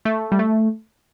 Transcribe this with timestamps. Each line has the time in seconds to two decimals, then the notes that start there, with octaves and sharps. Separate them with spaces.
0.05 A3
0.32 G3
0.39 A3